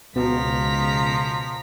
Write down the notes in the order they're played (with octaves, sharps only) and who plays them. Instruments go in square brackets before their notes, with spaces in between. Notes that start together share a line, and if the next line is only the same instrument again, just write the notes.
[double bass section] C#2 [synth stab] B2 [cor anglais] F3 [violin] A#5 B6